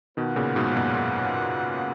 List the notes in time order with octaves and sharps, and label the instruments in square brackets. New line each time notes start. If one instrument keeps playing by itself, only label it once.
[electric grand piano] B2 D#3 [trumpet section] A#3 F4 B4 F#5
[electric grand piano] A#2 C#3
G#2 B2
B2
F#2 A#2
F#2